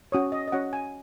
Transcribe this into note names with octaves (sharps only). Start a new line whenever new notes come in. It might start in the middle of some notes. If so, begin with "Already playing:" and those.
C#4 F#4 C#5 D#6
D#5
D#5
C#4 F#4 C#5 F#5
G#5